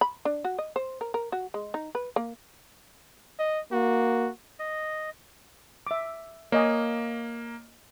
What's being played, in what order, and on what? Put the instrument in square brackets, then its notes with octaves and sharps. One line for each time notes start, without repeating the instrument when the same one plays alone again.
[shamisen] B5
D4
F#4
D#5
C5
A#4
A#4
F#4
G#3
D#4
B4
A#3
[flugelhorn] D#5
[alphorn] A#3 [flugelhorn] F#4
[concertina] D#5
[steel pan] E5 D6
[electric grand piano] A#3 [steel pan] C#5 D#5 G#5